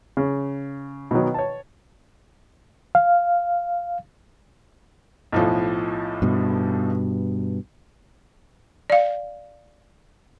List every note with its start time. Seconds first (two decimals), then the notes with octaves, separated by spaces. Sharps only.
0.17 C#3
1.11 B2 D#3 F#3
1.34 C#5 A5
2.95 F5
5.32 B1 A2 F3
6.22 G2 B2
8.90 D5 F5